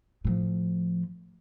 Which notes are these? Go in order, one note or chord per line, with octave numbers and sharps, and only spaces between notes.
A2 F3